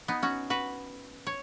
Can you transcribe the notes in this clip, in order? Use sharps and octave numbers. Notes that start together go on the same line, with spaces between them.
B3 D#4
C#4 F#4
F#4 B4
C#5